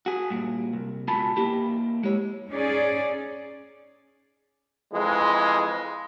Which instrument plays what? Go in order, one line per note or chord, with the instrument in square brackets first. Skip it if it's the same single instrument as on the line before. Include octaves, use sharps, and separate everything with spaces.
[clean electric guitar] F#4 G#4
G2 A#2
C2
C#2 B2 F4 G#5 A5 B5
A#3 E4 G4
G#3 C#5
[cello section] C#4 D#4 G#4 D5
[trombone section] F2 E3 G#3